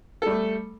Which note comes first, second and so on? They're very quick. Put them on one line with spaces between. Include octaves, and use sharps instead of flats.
A4 G3 A3